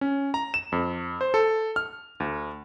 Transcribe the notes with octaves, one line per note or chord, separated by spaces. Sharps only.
C#4
A#5
E7
F2
C5
A4
F6
D2